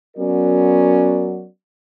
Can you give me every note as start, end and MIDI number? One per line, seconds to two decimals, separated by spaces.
0.17 1.45 54
0.17 1.45 59
0.17 1.45 61
0.17 1.45 66
0.17 1.45 70
0.17 1.45 74